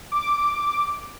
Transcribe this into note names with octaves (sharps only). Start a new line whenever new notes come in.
D6